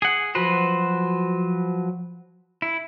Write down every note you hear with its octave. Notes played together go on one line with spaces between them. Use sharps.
G#4 F#5
F3 F#3 F#4 B4 C5
E4